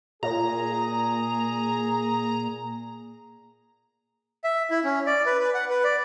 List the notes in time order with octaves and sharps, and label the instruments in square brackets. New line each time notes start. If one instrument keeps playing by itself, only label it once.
[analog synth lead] A#2 [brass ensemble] G#4 [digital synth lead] A#5
[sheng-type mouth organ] E5
E4
C#4
D5
B4
B4
F#5
B4
D5